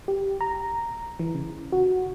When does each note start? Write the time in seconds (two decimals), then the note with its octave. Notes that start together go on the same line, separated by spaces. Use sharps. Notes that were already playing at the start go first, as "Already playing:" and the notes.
0.08 G4
0.41 A#5
1.19 E3
1.35 C#3
1.72 F#4